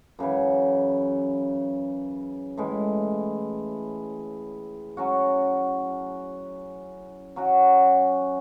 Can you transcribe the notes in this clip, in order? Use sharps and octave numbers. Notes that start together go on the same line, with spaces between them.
F#2 C#3 E3
A2 E3 G#3
F#3 C#4 F#4
F#3 C#4 F#4